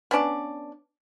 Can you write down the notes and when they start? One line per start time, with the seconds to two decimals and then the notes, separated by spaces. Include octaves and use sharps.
0.11 B3 C#4 D4 D5